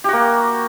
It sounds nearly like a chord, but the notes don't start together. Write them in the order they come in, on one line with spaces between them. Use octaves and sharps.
G4 F#4 A#3